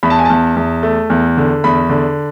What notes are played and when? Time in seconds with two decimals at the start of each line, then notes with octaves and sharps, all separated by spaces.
0.03 E2 B5
0.10 A5
0.19 G#5
0.25 E2 A5
0.56 E2
0.83 A3
1.10 E2
1.37 D3
1.64 E2 B5
1.90 D3